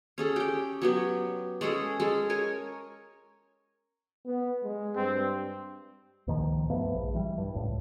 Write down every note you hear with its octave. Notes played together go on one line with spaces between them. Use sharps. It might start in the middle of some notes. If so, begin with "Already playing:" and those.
C#4 G#4 A4
G4 G5
F#3 B3 G4
G#3 C#4 G#4 A4
G#3 C#4 A4
A#4 C#5 G#5
B3
G#3
G2 C4
C#2 A#2 D#3 F3
G2 F3 A3 B3
A#1
E3 G3
G2
C#2 A2